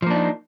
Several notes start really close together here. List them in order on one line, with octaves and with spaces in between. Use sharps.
F3 A#3 D4 D#4